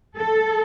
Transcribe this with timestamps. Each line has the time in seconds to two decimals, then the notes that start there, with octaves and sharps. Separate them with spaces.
0.16 A4